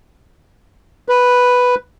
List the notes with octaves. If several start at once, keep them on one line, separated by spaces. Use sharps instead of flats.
B4